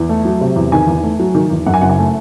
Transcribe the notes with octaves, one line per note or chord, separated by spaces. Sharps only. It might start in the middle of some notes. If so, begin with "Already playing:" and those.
Already playing: E2
A3
F#3
C3
E2
D#3 G#5
E2
A3
F#3
D#3
E2
F#2 F#5
G#5
F#1 F#5
G#5
A3